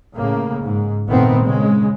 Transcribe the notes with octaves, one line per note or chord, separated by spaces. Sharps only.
A2 C#3 A#3
G#2
F#1 A#2 D#3 A3 B3 C4
C#3 G#3